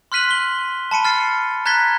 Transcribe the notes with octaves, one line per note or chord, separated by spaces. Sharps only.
C6 F6 F#6 B6 D#7 F#7
F#7 G7
A5 B5 C#7 D#7
F6 A6 C7 C#7
A#5 F#6 G#6 A6 B6 G7